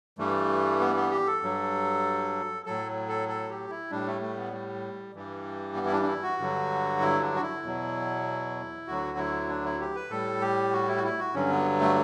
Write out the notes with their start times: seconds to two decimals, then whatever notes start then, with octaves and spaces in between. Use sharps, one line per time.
0.18 G2 E3 G3 A3
0.81 B3
0.96 B3
1.11 G4
1.27 A4
1.42 G2 F#3
2.66 A2 F#3 A4
3.08 A4
3.29 A4
3.49 G4
3.70 E4
3.91 A2 G3 D4
4.07 A3
4.22 A3
4.37 B3
4.53 G3
5.14 G2 E3 G3
5.76 B3
5.86 E4
5.92 D4
6.02 D4
6.07 E4
6.23 F#4
6.38 G2 D3 F#3
7.01 E4
7.21 D4
7.35 F#4
7.42 E4
7.63 E2 B2 F#3
8.87 D2 D3 F#3 F#4
9.18 E4
9.49 D4
9.64 E4
9.80 G4
9.95 B4
10.10 A2 G3 A4
10.41 G4
10.73 F#4
10.88 E4
10.97 F#4
11.04 E4
11.19 F#4
11.34 G2 D3 F#3 C#4
11.51 B3
11.81 A3